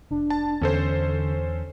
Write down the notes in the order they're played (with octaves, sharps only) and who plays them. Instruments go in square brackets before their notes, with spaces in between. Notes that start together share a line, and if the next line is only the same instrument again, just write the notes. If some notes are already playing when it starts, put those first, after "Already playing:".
[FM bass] F1 [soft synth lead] D4
[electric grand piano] A5
[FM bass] E2 [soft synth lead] D3 [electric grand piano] C#4 A4 C5